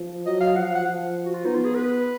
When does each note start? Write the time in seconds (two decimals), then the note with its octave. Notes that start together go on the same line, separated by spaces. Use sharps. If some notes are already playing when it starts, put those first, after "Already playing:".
Already playing: F3
0.26 F#3 D#5
0.41 F5
0.55 F3 F#5
0.65 F5
0.75 F#5
0.86 F3
1.26 F#4
1.35 F4
1.45 B3 D#4
1.55 F4
1.65 G#4
1.75 B4